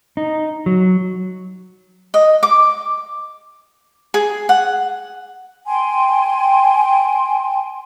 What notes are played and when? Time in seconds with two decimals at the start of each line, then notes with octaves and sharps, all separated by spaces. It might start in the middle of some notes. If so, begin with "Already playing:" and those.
0.17 D#4
0.66 F#3
2.14 D#5
2.43 D6
4.14 G#4
4.49 F#5
5.67 G5 G#5 C6